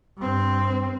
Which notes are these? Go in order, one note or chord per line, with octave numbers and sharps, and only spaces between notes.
G2 C4